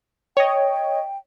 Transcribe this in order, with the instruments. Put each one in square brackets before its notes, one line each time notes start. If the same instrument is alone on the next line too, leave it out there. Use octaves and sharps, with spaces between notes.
[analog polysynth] C#5 D#5 [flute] G5